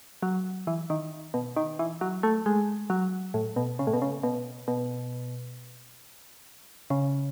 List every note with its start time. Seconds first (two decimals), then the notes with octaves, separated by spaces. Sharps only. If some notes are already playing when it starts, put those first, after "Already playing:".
0.23 F#3
0.67 E3
0.90 D#3
1.34 B2
1.56 D#3
1.79 E3
2.01 F#3
2.23 A3
2.46 G#3
2.90 F#3
3.34 A2
3.56 B2
3.79 C#3
3.87 A2
3.93 B2
4.02 C#3
4.23 B2
4.68 B2
6.90 C#3